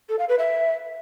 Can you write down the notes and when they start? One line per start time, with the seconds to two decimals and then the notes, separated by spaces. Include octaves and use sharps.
0.09 A4
0.19 F5
0.29 B4
0.39 E5